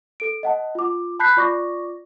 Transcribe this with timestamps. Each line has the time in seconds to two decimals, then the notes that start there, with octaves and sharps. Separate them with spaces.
0.20 A4 D7
0.43 D#5 F#5 A5
0.75 F4 D6
1.20 A5 B5 F#6 G6 B6 C7
1.37 F4 D5 C#6 D6 A#6